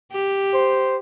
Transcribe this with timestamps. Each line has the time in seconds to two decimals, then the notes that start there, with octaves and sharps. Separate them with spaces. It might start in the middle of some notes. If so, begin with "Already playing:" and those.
0.12 G4
0.54 C5